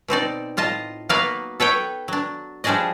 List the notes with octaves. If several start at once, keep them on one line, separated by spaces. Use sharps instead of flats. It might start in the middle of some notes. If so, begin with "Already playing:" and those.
B2 C4 D#4 D5
A2 F4 D#5 A5
F#3 A#3 B3 A#4 B4 F5
A4 B4 C#5 G5
F#3 D4
F3 G3 D4 G#4 D5 D#5